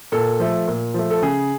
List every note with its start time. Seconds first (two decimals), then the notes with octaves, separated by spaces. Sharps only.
0.12 A#2 A4
0.39 F3 A3
0.68 A#2
0.94 F3 A3
1.11 A4
1.22 C#3 G#4